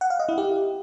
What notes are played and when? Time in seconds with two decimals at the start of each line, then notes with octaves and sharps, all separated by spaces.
0.01 F#5
0.10 F5
0.19 D#5
0.29 E4
0.38 G4